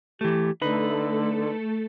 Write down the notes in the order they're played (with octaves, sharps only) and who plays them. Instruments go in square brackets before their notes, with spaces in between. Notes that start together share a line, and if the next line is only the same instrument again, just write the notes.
[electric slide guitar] E3 A3 [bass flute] G4
[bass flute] D3 [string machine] A3 A4 [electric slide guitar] D#4 B4